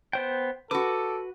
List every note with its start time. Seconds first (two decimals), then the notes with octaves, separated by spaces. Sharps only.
0.13 B3 C5 G5
0.71 F#4 A4 B4 D6